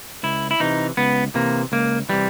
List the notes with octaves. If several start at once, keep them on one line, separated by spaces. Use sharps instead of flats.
C#2 E4
E4
C3 E3 D#4
C#2 B3
C3 E3 A#3
C#2 A#3
C3 E3 G3